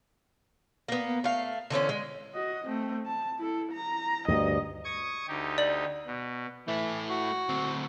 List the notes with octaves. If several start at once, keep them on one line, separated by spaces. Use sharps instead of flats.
A#3 B3
A3 F5
D3 E3 C4 C#4
G#3
F#4 D#5
A3 C4
A5
E4 A4
A#5
D2 G2 D#5
C#6 D#6 G#6
D2 D#4 G4
D5 F#7
B2
E3 A3 E4
F#4
D2 C4